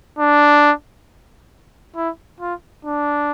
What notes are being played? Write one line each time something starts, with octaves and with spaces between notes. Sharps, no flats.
D4
E4
F4
D4